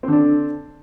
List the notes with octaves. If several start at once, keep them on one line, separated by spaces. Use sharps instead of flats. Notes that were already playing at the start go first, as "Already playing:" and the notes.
D3 C4 D4